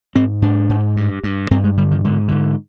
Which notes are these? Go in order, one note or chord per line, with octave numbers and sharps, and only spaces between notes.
G#2 C4
G#2 D4
G#2
G2
G2
G2 C4
G#3
D3 G3
D#3
G#2 D3
G#2 D3